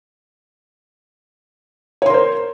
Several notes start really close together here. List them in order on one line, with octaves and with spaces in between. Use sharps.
C#5 C6 A#4 C5